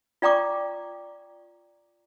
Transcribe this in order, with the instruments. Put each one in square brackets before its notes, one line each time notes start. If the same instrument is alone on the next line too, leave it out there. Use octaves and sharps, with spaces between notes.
[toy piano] F4 D5 G5 A#5 C#6 D6